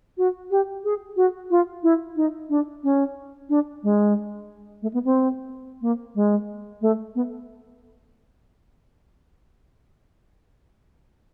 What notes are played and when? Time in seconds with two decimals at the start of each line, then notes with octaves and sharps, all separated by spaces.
0.18 F#4
0.51 G4
0.84 G#4
1.16 F#4
1.50 F4
1.83 E4
2.16 D#4
2.50 D4
2.84 C#4
3.49 D4
3.83 G#3
4.82 A3
4.93 B3
5.05 C4
5.82 A#3
6.15 G#3
6.81 A3
7.15 B3